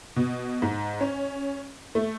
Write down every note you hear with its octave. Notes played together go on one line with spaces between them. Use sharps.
B2
G#2
C#4
A3